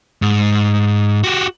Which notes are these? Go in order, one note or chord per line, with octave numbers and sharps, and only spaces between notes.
G#2
F#4 G4